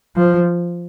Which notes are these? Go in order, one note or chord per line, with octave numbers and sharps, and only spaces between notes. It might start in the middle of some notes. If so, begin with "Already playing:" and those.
F3